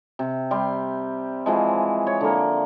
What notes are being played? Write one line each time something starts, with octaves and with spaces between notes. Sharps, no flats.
C3
G3 C6
E3 F3 G#3
C#5
D3 A#3